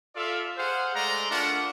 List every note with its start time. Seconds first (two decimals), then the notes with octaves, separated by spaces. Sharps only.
0.16 F4 A4 D5 E5 F5
0.57 G#4 C5 F5 F#5
0.95 G#3 A3 D5 A#5 C6
1.30 A3 D4 F4 A#4 F#5